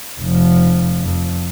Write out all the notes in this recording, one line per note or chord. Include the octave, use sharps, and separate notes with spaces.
F1 F3
F2